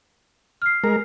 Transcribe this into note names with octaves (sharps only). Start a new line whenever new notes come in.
F6 C7
G#3 A#4